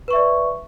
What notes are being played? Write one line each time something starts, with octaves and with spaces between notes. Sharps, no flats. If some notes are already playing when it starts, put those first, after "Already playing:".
B4 D5 E5 C#6